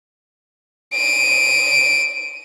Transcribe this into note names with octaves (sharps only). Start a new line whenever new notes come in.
D7 D#7